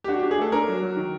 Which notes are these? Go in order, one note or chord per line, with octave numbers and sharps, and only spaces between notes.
G4
D4 F#4
D4 G4
G#4
A3 A4
D4 A#4
F#3
F#3
D#3